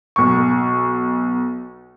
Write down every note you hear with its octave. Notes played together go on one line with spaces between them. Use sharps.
B1 C#6